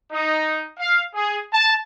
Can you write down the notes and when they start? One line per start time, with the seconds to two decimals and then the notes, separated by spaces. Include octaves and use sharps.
0.12 D#4
0.78 F5
1.14 G#4
1.53 A5